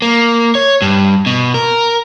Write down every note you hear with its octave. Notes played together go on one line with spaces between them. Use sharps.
A#3
C#5
G2
B2
A#4